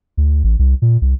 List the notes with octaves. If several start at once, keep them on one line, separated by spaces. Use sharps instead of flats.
D2
A1
C2
A#2
C2